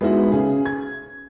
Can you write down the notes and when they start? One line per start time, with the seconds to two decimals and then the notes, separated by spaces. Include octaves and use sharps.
0.01 G#3 B3 D#4 E4 F#4
0.32 C#3 G#4
0.65 G#6